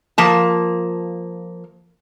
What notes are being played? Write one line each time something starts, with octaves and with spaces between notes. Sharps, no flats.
F3 A#3 A5